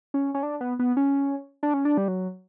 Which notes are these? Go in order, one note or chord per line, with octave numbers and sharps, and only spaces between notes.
C#4
C#4
D4
B3
B3
C#4
D4
C#4
D4
G3
F#3